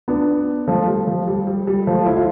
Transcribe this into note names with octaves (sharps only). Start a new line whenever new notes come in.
B3 D4
F3 A3
G3
F3
G3
G3
G3
F3 A3
E4
F4